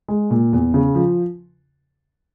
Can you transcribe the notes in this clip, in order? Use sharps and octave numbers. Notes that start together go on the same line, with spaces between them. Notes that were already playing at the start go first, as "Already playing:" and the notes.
G#3
A#2
E2
C#3
F3